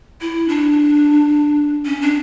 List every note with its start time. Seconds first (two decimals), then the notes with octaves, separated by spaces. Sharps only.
0.21 E4
0.49 D4
1.86 C#4
2.02 D4